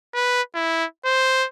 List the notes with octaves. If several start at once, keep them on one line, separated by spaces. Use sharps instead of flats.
B4
E4
C5